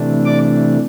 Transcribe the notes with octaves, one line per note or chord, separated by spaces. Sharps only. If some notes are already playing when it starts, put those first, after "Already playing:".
Already playing: C3 E3 A3 D4
D5 D6